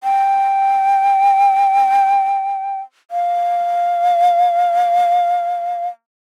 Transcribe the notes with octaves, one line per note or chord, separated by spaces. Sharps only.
G5
F5